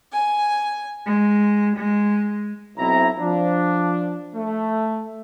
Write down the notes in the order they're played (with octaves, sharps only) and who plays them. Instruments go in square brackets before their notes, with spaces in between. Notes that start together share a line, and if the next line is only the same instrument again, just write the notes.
[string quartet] G#5
G#3
G#3
[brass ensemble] B1 C4 E4 A#5
F3 D4
A3